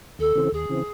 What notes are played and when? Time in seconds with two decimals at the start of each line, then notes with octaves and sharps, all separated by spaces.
0.19 D#2 A4
0.35 C#3 E3 C4
0.52 D#2 G#4
0.69 C#3 E3 C4